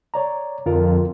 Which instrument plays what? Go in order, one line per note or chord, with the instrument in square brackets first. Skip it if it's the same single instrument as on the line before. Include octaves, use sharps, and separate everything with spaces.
[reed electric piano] C#5 D5 A#5
[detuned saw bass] F2 [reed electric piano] D3 F4 A#4